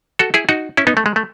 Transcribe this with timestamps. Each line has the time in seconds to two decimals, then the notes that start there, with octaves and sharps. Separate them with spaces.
0.19 F#4 A4
0.34 E4 G#4
0.49 D#4 F#4
0.77 C#4 E4
0.87 B3 D#4
0.97 A3
1.06 G#3
1.16 A3